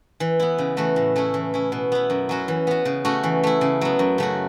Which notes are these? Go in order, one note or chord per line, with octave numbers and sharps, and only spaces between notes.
E3
B3 E4
C#3
E3 A3 F#4
A2
A3 C#4 E4
E3
C#4 E4
B2
B3 E4
F#2
F#3 C#4 F#4
E3
B3 F#4
C#3
A3 C#4 F#4
E3
A3 E4
C#3
F#3 B3
F#2
C#3 A3 F#4